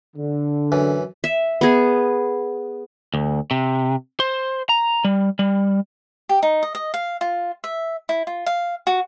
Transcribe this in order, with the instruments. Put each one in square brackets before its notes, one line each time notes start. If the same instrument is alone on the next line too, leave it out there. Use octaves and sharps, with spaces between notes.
[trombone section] D3
[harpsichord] F#2 E3
[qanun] E5
B3 G#4
[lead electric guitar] D2
C3
C5
A#5
G3
G3
[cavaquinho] G4
D#4
D#5
D#5
F5
F4
E5
E4
F4
F5
F#4